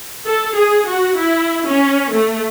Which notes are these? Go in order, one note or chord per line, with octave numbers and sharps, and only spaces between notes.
A4
G#4
F#4
E4
C#4
A3